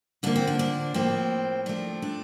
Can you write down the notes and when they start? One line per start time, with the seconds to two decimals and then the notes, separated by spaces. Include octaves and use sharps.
0.23 D3 F3 A#3 D4
0.36 C4
0.47 D4
0.59 D4
0.94 A2 F3 A#3 C4
1.66 C3 F3 A3 D4
2.02 D4